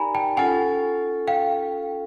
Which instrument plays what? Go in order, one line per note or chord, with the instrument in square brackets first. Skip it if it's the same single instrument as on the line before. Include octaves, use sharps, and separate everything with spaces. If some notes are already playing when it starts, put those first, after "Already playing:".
Already playing: [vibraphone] D#4 G4 A#4 D5 [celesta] G#5 A#5 B5
[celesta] G5 A5
[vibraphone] C#4 F4 A4 [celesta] F#5 G#5
[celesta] F5 G5